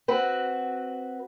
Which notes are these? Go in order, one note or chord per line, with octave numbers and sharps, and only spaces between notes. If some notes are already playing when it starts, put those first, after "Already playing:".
C4 F#4 B4